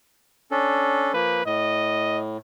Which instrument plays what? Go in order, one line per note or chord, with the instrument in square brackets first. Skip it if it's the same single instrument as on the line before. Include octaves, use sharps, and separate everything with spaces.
[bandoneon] C#4 D4 A4
[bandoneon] F3 A#3 [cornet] B4
[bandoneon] A2 [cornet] D#5